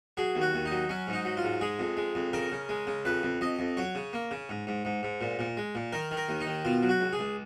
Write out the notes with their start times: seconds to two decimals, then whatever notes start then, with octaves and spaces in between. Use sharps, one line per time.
0.17 F#3 G#4
0.35 D#2
0.41 F#4
0.54 D#2
0.65 D#4
0.71 F#3
0.89 F#3 C#4
1.07 G#2
1.13 D#4
1.25 F#3
1.37 F4
1.43 G#2
1.61 G#3 G#4
1.79 F2
1.97 G#3
2.15 F2
2.33 C#3 A#4
2.52 C#3
2.69 G#3
2.87 C#3
3.05 F2 B4
3.23 F2
3.41 F2 D#5
3.59 F2
3.77 F#3 C#5
3.95 C#3
4.13 A#3
4.31 C#3
4.49 G#2
4.67 G#2
4.85 G#2
5.03 G#2
5.21 A#2
5.39 A#2
5.57 G#3
5.75 A#2
5.93 D#3 A#4
6.11 D#3
6.17 A#4
6.29 D#2
6.40 D#4
6.47 D#3
6.65 B2 F4
6.83 F#3
6.89 F#4
7.01 C#2
7.13 G#4
7.19 C#2